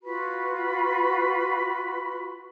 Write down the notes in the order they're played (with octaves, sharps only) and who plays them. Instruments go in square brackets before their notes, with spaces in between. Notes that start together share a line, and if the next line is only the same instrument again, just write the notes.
[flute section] F4 F#4 B4 B5